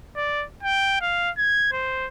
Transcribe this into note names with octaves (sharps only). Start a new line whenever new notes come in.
D5
G5
F5
G#6
C5